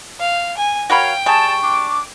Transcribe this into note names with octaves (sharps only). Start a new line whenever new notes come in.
F5
G#5
F#4 A#4 C#5 F5 G5 B5
G3 G#4 A5 C#6
D4 D6